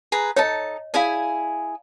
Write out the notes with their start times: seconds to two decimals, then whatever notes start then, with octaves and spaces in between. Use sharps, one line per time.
0.12 G#4 B4 A#5
0.36 D#4 A4 C#5 D#5 A5
0.94 E4 G#4 D5 F5 G#5